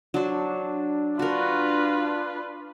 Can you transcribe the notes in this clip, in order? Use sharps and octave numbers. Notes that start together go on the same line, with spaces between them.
F#3 D4 C5
F4 F#4 A#4 B4